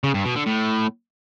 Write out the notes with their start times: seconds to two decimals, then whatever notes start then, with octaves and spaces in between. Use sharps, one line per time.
0.04 C#3
0.14 G2
0.25 B2
0.36 D3
0.47 A2